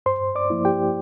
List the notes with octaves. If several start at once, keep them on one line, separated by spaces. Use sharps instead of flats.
G2 C5 C6
D5 D6
F3 A#3 E4
G4 G5